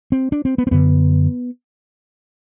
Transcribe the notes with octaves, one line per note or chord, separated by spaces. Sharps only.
C4
D4
C4
B3
C4
F#2 D3 B3